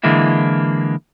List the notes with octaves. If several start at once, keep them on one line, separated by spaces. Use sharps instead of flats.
D3 E3 G#3 A#3 E4